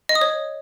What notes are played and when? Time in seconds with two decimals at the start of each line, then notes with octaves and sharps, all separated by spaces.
0.09 D#5
0.15 D#6
0.21 C#5